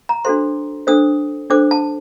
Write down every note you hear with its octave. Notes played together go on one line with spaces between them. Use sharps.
A#5
D4 F#4 A4 C5 C6
D4 A4 C5 D#6
D4 A4 C5 D6
A5